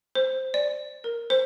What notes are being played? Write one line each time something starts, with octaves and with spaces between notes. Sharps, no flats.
C5
D5
A#4
C5